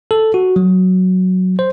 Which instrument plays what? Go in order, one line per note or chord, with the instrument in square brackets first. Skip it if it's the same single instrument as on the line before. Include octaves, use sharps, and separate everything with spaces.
[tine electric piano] A4
F#4
F#3
C5